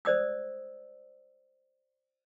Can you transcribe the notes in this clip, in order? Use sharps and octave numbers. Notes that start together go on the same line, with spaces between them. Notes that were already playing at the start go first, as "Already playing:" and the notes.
C5 D5 D#6 E6